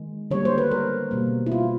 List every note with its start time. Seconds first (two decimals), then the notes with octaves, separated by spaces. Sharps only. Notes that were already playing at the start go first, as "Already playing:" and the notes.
Already playing: D#3 G#3
0.31 D3 G3 A#3 C#5
0.45 C5
0.58 B4
0.71 A#4
1.11 B2 G3 A#3
1.47 E4
1.52 F4